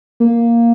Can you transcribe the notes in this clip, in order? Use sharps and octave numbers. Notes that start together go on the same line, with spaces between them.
A#3